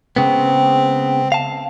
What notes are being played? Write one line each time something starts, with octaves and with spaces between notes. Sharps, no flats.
C#3 G#3 B3 C4
F5 A5